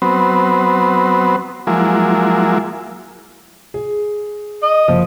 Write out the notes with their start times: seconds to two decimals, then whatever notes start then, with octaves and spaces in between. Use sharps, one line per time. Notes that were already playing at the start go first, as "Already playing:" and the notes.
0.02 F#3 B3 C4
1.67 F3 F#3 G#3 A#3 E4
3.74 G#4
4.63 D#5
4.88 F#1 F3